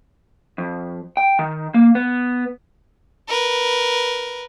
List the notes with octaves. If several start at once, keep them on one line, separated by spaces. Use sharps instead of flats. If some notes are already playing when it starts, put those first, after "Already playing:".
F2
G5
D#3
A#3
B3
A#4 B4